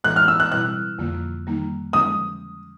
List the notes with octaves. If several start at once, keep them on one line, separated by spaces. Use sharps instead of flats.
A2 E3 G#3 F#6
F6
E6
F#6
B2 G3 C4 E4 F#6
F2 D3 F3 A#3
D#3 G3 A#3 D#4
D3 F3 G#3 C#4 D#6